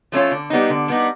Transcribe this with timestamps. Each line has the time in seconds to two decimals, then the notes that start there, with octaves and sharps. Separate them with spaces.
0.12 F3 A3 C#4 F4
0.31 D3
0.50 G3 B3 D#4
0.70 D3
0.88 G3 B3 D#4